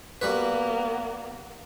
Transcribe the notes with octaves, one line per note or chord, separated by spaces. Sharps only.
G3 A#3 B3 F#4 B4